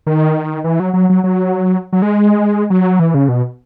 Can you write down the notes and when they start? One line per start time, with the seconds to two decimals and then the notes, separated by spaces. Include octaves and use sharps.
0.07 D#3
0.64 E3
0.80 F#3
0.94 F#3
1.09 F#3
1.24 F#3
1.93 F#3
2.02 G#3
2.70 F#3
2.99 E3
3.14 C#3
3.29 B2